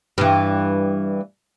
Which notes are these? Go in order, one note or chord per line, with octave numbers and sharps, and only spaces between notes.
G2 E3